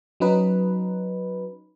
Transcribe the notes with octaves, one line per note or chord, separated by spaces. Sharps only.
F#3 C#4 D#4 B4